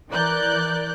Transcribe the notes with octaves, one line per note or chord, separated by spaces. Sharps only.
E3 A#4 D5 F#6 G6